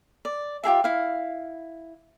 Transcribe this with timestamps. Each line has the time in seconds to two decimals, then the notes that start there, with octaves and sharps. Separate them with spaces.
0.25 D5
0.64 F4 G4 G#4 E5
0.84 E4 F5